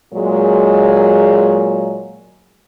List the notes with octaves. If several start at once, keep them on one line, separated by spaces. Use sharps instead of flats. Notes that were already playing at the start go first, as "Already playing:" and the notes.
A#2 F#3 G#3